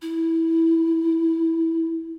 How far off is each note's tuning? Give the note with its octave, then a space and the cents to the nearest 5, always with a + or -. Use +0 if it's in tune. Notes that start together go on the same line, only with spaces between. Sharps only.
E4 -10